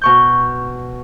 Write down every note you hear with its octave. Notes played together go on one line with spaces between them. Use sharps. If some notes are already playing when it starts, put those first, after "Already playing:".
B2 C#6 G6